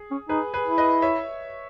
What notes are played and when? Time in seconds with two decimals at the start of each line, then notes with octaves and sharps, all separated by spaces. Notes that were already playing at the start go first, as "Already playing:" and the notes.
Already playing: G#4
0.11 C#4
0.29 D#4 G#4 B4
0.54 G#4 B4
0.66 E4
0.78 B4 D#5
1.02 C#5 E5